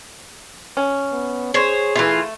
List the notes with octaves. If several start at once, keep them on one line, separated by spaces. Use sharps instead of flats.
C#4
B3
G#4 C5 C#5
E3 A3 F4